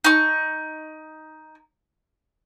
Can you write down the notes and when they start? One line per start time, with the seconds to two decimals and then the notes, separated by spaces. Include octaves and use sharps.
0.04 D#4 C#6